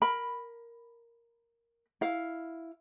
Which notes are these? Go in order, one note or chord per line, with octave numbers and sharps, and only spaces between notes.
A#4 B5
E4 F5